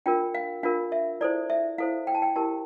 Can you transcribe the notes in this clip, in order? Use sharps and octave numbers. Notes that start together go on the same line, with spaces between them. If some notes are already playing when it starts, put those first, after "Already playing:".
D4 F4 A#4 G5
F5
D4 F4 A#4 F5
E5
E4 A4 C5 D5
E5
E4 A4 C5 F5
G5
A5
G5
E4 G4 A#4 A5